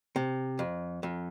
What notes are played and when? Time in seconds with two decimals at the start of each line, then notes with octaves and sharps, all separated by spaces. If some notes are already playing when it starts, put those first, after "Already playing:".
0.16 C3
0.59 F2
1.03 F2